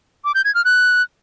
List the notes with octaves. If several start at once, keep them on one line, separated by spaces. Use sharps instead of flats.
D6
G6
G#6
F6
F#6